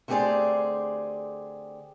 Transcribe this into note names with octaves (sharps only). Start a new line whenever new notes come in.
D3 A3 C4 G4 G#4 D5